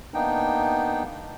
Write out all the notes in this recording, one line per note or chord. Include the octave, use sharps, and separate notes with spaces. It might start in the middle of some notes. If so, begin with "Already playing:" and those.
A#3 B3 D4 D#4 G5